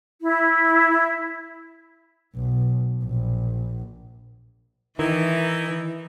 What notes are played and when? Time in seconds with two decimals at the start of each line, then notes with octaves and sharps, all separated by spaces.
0.20 E4
2.36 B1
3.04 A#1
4.99 D#3 E3 D#4 E4